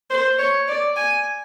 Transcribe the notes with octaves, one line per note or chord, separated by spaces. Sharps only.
C5
C#5
D5
G#5